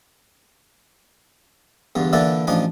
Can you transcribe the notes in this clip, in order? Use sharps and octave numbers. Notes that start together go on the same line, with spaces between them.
E2 G2 D3
A#2 D3 E3 D4 E4 A4
A1 F3 D4 D#4 G#5